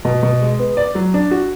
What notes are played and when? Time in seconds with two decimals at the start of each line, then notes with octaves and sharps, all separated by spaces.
0.05 B2
0.23 B2
0.42 G#3
0.59 B3
0.77 D5
0.95 F#3
1.14 D4
1.31 F#4